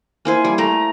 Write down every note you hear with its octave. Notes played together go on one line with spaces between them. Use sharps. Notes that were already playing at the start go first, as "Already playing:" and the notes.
A#3 E4 C5 G#5
G3
A3 G5 A#5